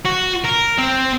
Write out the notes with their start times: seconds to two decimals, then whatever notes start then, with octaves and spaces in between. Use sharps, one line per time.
0.06 F#4
0.45 A#4
0.79 C4